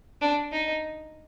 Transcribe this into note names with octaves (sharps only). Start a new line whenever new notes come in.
D4
D#4